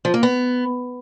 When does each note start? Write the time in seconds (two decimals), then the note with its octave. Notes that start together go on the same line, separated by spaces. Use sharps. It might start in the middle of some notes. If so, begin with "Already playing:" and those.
0.05 F3
0.14 A#3
0.23 B3